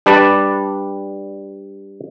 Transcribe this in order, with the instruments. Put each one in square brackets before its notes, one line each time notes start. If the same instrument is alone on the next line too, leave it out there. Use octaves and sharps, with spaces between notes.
[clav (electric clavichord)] G3 D4 B4 D5